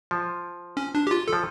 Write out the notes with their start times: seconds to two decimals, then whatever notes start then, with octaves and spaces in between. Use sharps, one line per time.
0.11 F3
0.77 C#4
0.95 D4
1.07 G4
1.11 F4
1.28 A4
1.33 F3